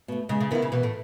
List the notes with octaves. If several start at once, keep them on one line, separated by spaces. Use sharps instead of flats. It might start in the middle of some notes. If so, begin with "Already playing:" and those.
B2 A3
C#3 G#3
C#3
D#3 B3 E4
C#3
B2 E3
A2